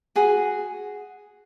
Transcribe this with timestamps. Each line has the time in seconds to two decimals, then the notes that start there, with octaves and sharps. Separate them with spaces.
0.16 F#4 G#4